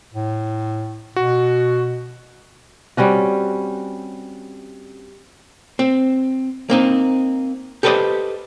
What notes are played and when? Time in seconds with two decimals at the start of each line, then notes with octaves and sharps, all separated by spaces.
0.14 A2
1.16 B2 F#4
2.97 G3 C4 C#4 F#4
5.79 C4
6.70 A#3 C4 D#4
7.83 G4 A4 B4 C5 D5 D#5